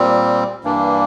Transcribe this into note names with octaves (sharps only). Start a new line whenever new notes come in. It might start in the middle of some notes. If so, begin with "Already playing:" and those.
Already playing: A#2 G3 C4
G2 E3 G3 A#3 D4